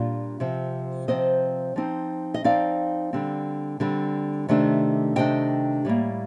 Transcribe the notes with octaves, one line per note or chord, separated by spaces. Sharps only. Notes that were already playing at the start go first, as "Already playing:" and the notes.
Already playing: A#2 G3 D4 F4
C3 F3 C4
C3 F3 C4 C5 D#5
F3 C4 D#4
D#5
F3 C4 D#4 D5 F5
D3 G3 C4
D3 G3 C4
C3 D#3 A3 D4
C3 D#3 A3 D4 D#5 G5
A2 G3 A#3